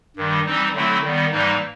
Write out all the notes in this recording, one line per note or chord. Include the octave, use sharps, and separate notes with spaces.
G2 D#3 G3
E3 G3 C4 D#4
D3 F#3 A3 C4 E4
D#3 G3 B3
G#2 E3 G3 A#3 D#4